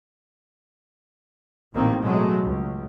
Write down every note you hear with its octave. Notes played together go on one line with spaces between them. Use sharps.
A1 A#2 D#3 A#3 C4
B2 F#3 G#3 A3
C#2